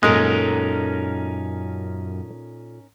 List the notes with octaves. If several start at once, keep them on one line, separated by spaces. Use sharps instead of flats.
F#2 A#2 G#3 C#4 D#4 A4 A#4 D#5